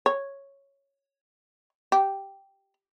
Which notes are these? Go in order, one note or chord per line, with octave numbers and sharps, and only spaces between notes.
C#5
G4